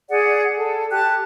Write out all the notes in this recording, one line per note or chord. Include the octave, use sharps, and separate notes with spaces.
G#4 D5 F#5
A4
G4 A5 F#6